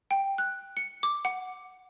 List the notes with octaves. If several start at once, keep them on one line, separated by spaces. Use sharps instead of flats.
G5
F#6
C#7
D6
F#5